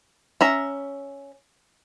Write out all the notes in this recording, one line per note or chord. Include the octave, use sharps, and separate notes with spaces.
C#4 E5 A#5